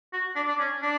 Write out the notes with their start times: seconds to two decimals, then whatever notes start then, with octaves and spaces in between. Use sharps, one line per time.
0.13 F#4
0.36 D4
0.48 D4
0.59 C#4
0.83 D4